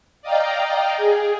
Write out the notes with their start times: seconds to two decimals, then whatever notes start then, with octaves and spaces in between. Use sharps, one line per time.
0.22 D5 D#5 F5 G5 A#5
0.97 G#4